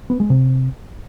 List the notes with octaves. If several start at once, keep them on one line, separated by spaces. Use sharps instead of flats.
B3
G#3
C3